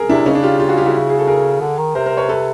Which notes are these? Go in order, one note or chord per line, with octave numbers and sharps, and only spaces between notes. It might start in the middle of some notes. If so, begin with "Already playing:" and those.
Already playing: G#4 A#4
C3 D4 E4
C#3 C#4 D#4
D4
F4 G4
F4 G4
F#4 G#4
F4 G4
E4 F#4
G#4
A4
G#4 A#4
D3
D#3
C3 A#4 C5
A#4 C5
B4 C#5
A4 B4